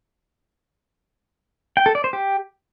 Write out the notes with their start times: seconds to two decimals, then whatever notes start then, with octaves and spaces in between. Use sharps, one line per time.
1.77 G5
1.86 A4
1.95 D5
2.04 C5
2.13 G4